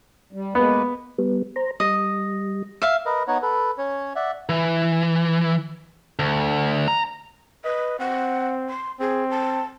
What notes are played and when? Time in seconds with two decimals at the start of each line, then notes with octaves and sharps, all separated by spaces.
0.33 G3
0.55 G#3 A#3 B3 B4
1.18 G3 B3
1.56 C5 A#5
1.80 G3 D#5
2.82 E5 F5
3.06 A#4 B4 D#5
3.28 B3 D#4 C#5 F#5
3.42 A4 B4
3.78 C#4 C#5
4.16 D5 E5 F#5
4.49 E3
6.19 D2
6.88 A#5
7.64 B4 D#5
7.99 C4 F#5
8.69 C6
9.00 C4 G#4
9.30 A5